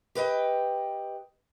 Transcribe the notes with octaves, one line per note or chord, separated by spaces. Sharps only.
G4 B4 D#5 G5